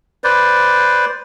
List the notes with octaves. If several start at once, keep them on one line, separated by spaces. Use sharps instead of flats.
B4 C5 D5